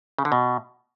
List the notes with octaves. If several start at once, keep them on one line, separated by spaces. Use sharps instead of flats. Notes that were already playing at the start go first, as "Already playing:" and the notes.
C#3
D3
B2